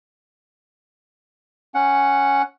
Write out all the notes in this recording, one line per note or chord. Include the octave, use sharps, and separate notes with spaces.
C#4 F#5